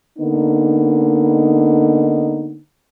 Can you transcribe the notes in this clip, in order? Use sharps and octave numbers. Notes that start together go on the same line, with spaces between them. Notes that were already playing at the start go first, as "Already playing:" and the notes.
D3 A#3 B3 D#4